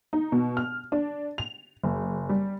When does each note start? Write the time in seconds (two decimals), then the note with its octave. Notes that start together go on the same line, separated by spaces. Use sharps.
0.13 D#4
0.32 B2
0.57 F6
0.92 D4
1.38 F7
1.84 F#1
2.29 G3